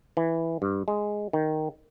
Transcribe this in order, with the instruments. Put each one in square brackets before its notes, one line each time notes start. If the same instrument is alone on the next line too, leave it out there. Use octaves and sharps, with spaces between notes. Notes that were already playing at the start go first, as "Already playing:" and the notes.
[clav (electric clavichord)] E3
G2
G#3
D#3